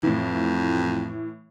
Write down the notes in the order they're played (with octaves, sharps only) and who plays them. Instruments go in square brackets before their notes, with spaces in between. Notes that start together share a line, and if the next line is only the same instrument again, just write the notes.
[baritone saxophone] F2 [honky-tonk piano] A2 E3